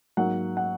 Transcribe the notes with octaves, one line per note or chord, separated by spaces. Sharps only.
G#2 F#3 A#3 F#5
F#5